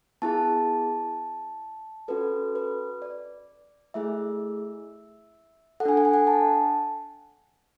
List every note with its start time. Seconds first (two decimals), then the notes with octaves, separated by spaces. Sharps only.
0.22 B3 E4 G#4 A5
2.08 C#4 F#4 A4 B4
2.55 B4
3.02 D5
3.94 A3 E4 G#4 E5
5.80 A4 F#5
5.85 D4 G#5
5.97 F#5
6.05 G#5
6.14 F#5
6.27 A5